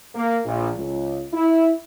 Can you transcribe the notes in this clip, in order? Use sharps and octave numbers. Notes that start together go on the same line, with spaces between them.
A#3
A#1
C#2
E4